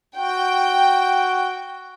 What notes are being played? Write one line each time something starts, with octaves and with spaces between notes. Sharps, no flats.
F#4 G5